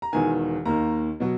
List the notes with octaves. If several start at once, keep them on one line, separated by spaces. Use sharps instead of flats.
A#5
E1 E2 D#3 G#5
D#2 D#3 A#3 A#5
B2 F#3